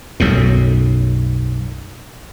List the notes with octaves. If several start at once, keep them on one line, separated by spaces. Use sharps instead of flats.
B1 F#2 A2